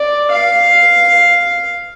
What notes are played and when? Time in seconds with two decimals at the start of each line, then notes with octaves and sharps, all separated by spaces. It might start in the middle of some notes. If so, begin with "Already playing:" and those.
Already playing: D5
0.31 F5